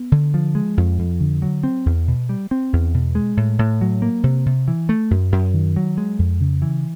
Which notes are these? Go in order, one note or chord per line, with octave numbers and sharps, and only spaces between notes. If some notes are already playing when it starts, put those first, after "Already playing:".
Already playing: B3
D3
F3
G#3
F2
F2
D3
F#3
C4
E2
B2
G3
C4
E2
B2
G#3
A2
A2
F#3
A#3
C3
C3
E3
A3
F#2
F#2
D#3
F#3
G#3
F2
C#3
E3